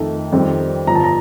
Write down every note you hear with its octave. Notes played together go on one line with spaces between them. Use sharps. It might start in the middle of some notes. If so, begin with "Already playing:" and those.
Already playing: F2 D#3 A3 D#4
F2 D#3 G3 C4
G1 G2 F3 A#5
A5
A#5